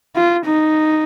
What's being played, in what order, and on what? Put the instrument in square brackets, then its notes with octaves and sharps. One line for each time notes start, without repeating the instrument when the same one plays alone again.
[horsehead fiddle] F4
D#4